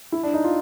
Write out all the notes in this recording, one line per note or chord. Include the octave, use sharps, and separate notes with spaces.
E4
D4
D#4
F4